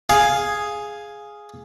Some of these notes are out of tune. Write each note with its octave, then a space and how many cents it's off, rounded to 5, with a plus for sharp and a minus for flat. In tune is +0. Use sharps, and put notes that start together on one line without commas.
G#4 +0 F5 +0